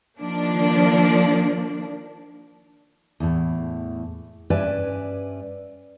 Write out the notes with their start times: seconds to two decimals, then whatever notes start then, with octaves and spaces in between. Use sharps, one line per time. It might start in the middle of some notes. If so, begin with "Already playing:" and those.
0.20 D#3 F3 A#3 D4
3.20 E2 A2
4.50 G2 C#4 B4 D5 E5 G#5